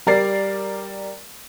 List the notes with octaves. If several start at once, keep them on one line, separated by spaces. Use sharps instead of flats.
G3 A#4 D5 A6 C7